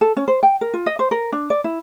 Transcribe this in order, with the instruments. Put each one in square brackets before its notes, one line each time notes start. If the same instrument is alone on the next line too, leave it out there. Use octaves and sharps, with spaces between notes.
[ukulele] A4
C#4
C5
G5
A#4
F4
D#5
C5
A#4
D4
D5
E4